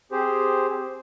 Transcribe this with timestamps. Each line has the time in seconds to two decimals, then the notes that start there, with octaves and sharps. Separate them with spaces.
0.12 C4 G4 G#4 C5